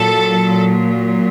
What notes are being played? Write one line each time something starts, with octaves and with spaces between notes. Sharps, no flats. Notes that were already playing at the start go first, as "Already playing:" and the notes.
Already playing: A#2 F#3 A4